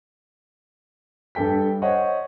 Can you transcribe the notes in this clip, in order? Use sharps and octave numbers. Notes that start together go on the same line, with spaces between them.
G2 A4 G5 B6
C5 C#5 D#5 F#5